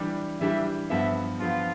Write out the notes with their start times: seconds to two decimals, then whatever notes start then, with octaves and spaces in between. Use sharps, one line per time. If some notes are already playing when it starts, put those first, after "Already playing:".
Already playing: E3 G3 D4 G4
0.41 E3 G3 D4 G4 E5
0.90 G2 F3 B3 E5
1.40 G2 F3 B3 F4